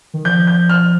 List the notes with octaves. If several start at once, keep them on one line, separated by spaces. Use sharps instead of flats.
D#3
F3 G6
G6
F6